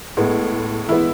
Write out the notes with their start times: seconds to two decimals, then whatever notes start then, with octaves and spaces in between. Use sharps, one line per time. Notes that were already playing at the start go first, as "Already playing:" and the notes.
0.17 A2 G#3 B3
0.89 E3 G#3 B3 E4